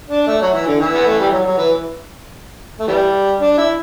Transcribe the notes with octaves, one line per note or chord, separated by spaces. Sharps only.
D4
A3
F#3
E3
D3
E3
B3
A3
G3
F#3
F#3
E3
A3
E3 G3
D4
E4